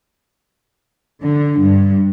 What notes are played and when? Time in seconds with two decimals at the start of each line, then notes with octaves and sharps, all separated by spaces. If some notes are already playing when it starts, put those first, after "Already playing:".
1.22 D3
1.60 G2